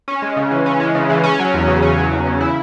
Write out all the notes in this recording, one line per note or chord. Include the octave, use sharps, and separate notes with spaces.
C#4
G#3
C#3
E3
C#4
G#3
C#3
E3
C#4
F#3
E2
C#3
C#4
F#3
E2
C#3
E4